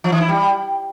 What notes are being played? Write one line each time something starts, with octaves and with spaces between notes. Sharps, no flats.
F3
E3
E4
G3